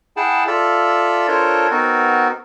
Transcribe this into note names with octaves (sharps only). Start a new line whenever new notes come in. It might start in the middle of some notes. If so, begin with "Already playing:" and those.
E4 G#4 F#5 G5 A5
F4 A4 D5 E5 F5
D4 F4 A4 A#4 C5 C#5
B3 C4 D#4 F#4 A#4